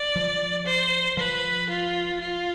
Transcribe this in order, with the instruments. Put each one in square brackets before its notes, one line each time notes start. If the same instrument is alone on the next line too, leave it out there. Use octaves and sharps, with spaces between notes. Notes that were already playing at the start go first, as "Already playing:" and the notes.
Already playing: [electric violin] D5
[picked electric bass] F3
[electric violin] C5
[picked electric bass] F3 [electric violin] B4
[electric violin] F4
F4